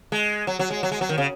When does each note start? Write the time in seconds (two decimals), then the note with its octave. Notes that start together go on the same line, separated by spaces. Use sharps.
0.12 G#3
0.47 F#3
0.59 F#3
0.71 G#3
0.83 F#3
0.92 G#3
1.01 F#3
1.09 D#3
1.18 C#3